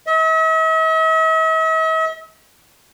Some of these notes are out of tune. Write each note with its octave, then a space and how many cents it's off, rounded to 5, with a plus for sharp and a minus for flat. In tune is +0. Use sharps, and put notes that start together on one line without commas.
E5 -45